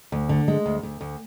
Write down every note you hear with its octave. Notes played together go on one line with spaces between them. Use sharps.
D2
D3
G#3
D2
D2
D2